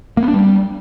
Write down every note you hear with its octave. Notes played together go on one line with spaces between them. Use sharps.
A#3
B3
D4
G3